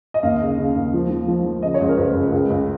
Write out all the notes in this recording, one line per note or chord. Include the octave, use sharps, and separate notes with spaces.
D#5
D#2 F5
C#3
C#3
D#2
F3
F3
F3
F3
C#3 D#5
C#5
C#2
A#4
C#2 B4
C#2
C#2
C#2